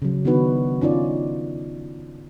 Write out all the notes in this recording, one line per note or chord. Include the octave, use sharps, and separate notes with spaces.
C#3 F#3
D#3 B3 D4 D#4 F#4 B4
C#4 D#4 F4 D5